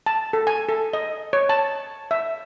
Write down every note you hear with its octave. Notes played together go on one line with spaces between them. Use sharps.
A5
A4
G#5
A4
D#5
C#5
A5
E5